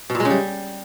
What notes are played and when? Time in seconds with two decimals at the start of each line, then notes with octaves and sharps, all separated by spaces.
0.10 B2
0.15 A#2
0.20 G#3
0.25 C#3
0.30 G3